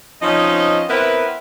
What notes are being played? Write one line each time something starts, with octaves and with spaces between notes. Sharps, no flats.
F3 C4 C#4 D#4 D#5
B3 C4 E4 A#4 B4